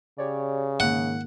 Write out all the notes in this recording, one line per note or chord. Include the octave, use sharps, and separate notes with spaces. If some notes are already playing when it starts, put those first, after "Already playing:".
C#3 G4 C#5 D5
G#2 D#3 A#3 F#5